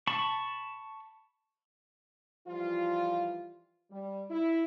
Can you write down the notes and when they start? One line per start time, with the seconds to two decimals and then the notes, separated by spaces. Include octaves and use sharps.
0.07 A5 B5 C#6
2.47 E3 F3 G3 F4
3.91 G3
4.29 E4